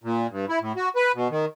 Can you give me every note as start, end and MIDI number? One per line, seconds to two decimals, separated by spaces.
0.04 0.27 46
0.30 0.45 43
0.49 0.59 64
0.61 0.72 45
0.76 0.89 66
0.96 1.12 71
1.15 1.28 47
1.30 1.45 51